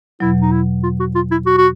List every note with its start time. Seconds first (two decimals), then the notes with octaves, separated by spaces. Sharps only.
0.20 E2 B2 F#3 E4
0.42 D#4
0.52 E4
0.83 F4
1.00 F#4
1.15 F4
1.31 E4
1.46 F#4
1.58 F#4